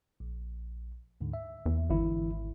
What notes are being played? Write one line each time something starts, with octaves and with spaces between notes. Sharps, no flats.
A#1
D2 G#2 D3
E5
E2
G#1 D3 E3 E4